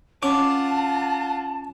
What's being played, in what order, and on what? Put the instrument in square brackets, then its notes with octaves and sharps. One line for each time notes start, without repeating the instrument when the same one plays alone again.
[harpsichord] C#4 [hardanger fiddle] F4 F#5 [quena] A5 [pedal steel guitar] D6